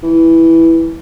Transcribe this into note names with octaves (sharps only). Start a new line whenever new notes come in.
E3